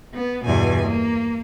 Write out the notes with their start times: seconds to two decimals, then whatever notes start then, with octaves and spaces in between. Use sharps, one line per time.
0.15 B3
0.44 E2 G2 B2 G#5
0.86 A#3